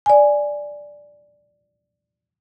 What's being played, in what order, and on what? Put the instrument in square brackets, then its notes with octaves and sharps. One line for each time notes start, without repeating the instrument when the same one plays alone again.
[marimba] D5 G#5